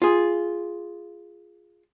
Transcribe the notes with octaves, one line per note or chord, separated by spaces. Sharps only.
F4 G#4